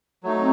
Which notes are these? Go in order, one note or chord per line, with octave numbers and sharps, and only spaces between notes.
F#3 A3 D#4
C4